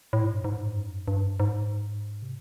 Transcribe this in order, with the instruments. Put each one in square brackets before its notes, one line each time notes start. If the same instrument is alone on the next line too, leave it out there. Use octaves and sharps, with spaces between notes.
[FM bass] A2
G#2
G2
G#2
G2
F#2
G2
G#2
C3